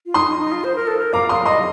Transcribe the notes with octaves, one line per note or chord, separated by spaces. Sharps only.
F4
D#4 C6 D#6
D#4
D#4
F4
C5
A#4
A4
A#4
F5 A#5 D6
F5 C6 D#6
D#5 C6 D#6